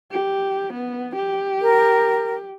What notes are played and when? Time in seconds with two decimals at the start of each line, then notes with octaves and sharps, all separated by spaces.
0.12 G4
0.73 B3
1.16 G4
1.62 A#4